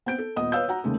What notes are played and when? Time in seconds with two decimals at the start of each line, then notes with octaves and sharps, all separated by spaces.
0.06 B3 C4 G6 D7
0.18 A4
0.36 D#1 B3 D#5 D#6
0.52 B4 C#5 F5 E6 G6
0.68 F#4 F#5 A#5
0.84 D#2 C#3 G#3 A3